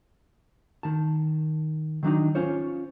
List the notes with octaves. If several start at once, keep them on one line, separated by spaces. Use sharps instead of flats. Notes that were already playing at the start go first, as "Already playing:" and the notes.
D#3 A5
D#3 F#3 D4 D#4
C#4 F4 C5 C#5